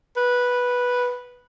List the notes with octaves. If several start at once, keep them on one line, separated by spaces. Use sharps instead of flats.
B4